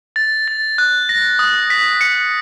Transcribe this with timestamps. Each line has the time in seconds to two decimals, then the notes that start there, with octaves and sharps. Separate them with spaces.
0.16 A6
0.48 A6
0.78 F#6
1.09 A#6
1.39 D#6
1.70 B6
2.01 C#7